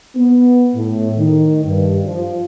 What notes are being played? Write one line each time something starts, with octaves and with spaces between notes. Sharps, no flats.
B3
A2
D#3
G2
F3